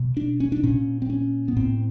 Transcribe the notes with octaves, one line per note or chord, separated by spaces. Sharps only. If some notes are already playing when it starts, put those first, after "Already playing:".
Already playing: B2
D4
C#4
D4
A#2 C#4
C4
C#4
B3
A2 C4